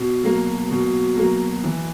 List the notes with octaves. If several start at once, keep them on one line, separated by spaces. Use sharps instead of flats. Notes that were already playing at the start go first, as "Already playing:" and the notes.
Already playing: B2
F#3 A#3
B2
F#3 A#3
E3